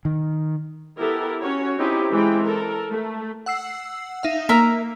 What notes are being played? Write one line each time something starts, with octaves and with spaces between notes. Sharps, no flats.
D#3
B3 E4 G4 A4 A#4
C#4 F#4 C#5
C4 C#4 D#4 E4 G4
E3 G#3 C4 G5
A4 A#4
A3
F#5 E6 C7
D#4 E5 F5
A#3 A#4 E5 A#5